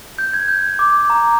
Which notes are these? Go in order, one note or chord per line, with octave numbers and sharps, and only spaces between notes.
G6
G#6
G6
D6
A#5